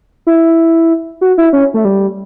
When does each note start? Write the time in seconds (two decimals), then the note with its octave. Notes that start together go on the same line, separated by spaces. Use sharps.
0.27 E4
1.21 F#4
1.38 E4
1.53 C#4
1.74 A3
1.85 G3